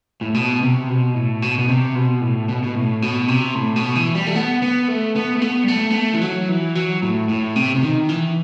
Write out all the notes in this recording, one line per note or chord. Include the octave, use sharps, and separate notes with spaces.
A2
B2
C3
B2
A2
B2
B2
C3
B2
A2
B2
B2
A2
B2
C3
A2
B2
E3
G3
A3
B3
B3
A3
B3
A3
B3
G3
A3
B3
A3
E3
F#3
E3
F#3
A2
A2
C3
C3
D#3
E3